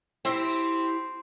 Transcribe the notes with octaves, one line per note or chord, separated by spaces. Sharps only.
C4 E4 G4